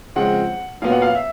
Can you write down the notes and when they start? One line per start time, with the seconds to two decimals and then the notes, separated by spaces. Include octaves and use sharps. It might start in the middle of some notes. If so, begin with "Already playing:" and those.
0.16 C#3 F3 G#3 C4 F#5
0.82 A#2 F#3 B3 F5
0.92 F#5
1.02 F5
1.15 E5